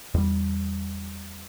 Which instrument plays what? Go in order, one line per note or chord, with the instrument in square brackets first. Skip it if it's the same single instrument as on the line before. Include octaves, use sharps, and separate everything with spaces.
[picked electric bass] E2 G3